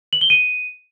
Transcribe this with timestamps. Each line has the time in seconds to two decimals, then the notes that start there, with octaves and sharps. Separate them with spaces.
0.13 F#7
0.21 G7
0.30 D#7